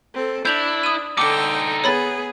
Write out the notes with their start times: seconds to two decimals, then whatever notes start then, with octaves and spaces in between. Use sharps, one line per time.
0.14 C4 A4
0.45 D4 E4 G6 F7 F#7
0.83 D#6 D#7
1.17 D3 D#4 A4 G5 D6 C#7
1.84 B3 G#4 C#5 B5 A6